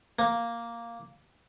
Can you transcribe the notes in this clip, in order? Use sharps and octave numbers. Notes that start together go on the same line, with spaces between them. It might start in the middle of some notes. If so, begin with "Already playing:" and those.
A#3